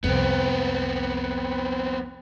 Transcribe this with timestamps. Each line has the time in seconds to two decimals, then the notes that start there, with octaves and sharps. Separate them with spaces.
0.04 C2 F2 B3 C4